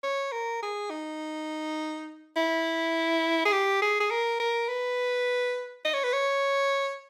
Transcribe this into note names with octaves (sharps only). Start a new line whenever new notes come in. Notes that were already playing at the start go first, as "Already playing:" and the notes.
C#5
A#4
G#4
D#4
E4
G#4
G4
G#4
G#4
A#4
A#4
B4
D#5
C#5
B4
C#5